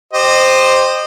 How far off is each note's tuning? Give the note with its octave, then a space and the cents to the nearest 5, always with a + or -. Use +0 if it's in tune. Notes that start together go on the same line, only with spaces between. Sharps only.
G4 +0 C5 +0 D#5 -20